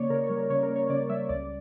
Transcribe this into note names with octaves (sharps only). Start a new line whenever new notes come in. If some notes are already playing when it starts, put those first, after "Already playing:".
Already playing: C#3 A#3 C#5 D5
C#3 A#4
C#5
G3
A#4
C#3 C#5
A#4
A#3
C#5
C#3 D5
G3 E5
C#2 D5